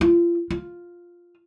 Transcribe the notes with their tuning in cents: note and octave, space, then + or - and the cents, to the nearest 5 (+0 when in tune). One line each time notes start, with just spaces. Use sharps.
F4 -30
F4 +0